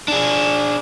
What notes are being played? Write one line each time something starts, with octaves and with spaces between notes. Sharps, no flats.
D4 G#4